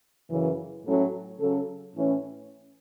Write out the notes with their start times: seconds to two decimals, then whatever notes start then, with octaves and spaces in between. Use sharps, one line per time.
0.30 F#2 C#3 E3
0.85 A2 F#3 C#4 E4 A4
1.40 C#3 F#3 C#4 A4
1.95 A2 E3 C#4